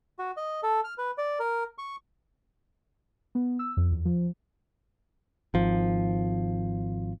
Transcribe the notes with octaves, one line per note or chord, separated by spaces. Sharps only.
F#4
D#5
A4
F6
B4
D5
A#4
C#6
B3
E6
F2
E2
F3
G#1 F3